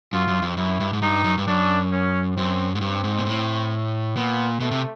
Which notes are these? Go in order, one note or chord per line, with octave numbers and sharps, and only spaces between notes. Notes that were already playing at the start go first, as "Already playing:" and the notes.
F#2 F4
F#2
F2
F#2 E4
G2
G#2
G2 D#4
F#2
G2
F#2 D4
C#4
F#2 C4
G#2
G2 C4
G#2
A#2
A2
A#2 B3
B2 A3
C3